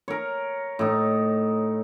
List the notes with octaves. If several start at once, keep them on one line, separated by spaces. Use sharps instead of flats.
A#4 C#5
A2 D#4